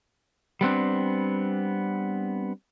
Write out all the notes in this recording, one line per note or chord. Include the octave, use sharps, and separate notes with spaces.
G3 B3 C4 D4